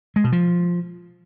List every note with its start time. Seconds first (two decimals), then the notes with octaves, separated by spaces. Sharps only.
0.16 G#3
0.24 B2
0.32 F3